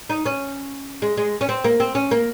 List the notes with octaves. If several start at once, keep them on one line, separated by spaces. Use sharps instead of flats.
D#4
C#4
G#3
G#3
C#4
C4
A#3
C4
C#4
A#3